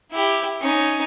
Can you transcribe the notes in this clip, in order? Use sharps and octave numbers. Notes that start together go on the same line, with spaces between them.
E4 G4
C#4 D#4